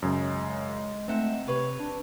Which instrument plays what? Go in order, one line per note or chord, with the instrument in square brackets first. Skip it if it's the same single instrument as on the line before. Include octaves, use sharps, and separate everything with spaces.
[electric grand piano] F#2 C#3 [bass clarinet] G#3
[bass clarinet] A3 [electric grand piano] C4 [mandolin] D#4 E5 F#5
[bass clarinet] C3 [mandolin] B4 C#5 F5
[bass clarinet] D4